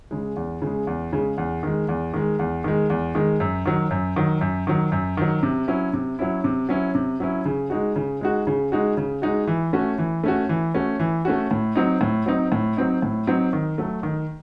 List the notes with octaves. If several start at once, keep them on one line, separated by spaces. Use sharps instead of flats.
C#3 G#3
E2
C#3 G#3
E2
C#3 G#3
E2
D#3 G#3
E2
D#3 G#3
E2
D#3 G#3
E2
D#3 G#3
F#2
D#3 F#3
F#2
D#3 F#3
F#2
D#3 F#3
F#2
D#3 F#3
C3
F#3 C#4 E4
C3
F#3 C#4 E4
C3
F#3 C#4 E4
C3
F#3 C#4 E4
C#3
G#3 D#4 F#4
C#3
G#3 D#4 F#4
C#3
G#3 D#4 F#4
C#3
G#3 D#4 F#4
E3
A3 C#4 F#4
E3
A3 C#4 F#4
E3
A3 C#4 F#4
E3
A3 C#4 F#4
A2
F#3 C4 D#4
A2
F#3 C4 D#4
A2
F#3 C4 D#4
A2
F#3 C4 D#4
D#3
F#3 A3
D#3